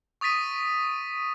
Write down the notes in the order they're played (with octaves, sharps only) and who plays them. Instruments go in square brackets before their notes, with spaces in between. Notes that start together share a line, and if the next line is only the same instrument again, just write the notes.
[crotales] C#6 D#6 A6 B6 D#7